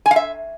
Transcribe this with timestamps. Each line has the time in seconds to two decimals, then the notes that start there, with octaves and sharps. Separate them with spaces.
0.06 G#5
0.11 F5
0.16 E5